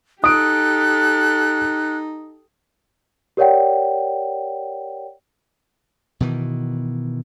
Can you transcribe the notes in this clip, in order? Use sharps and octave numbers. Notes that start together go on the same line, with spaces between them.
D#4 G4 A4 D#6 F#6 D7
G4 A#4 C#5 D5 F#5 G5
B2 D#3 E3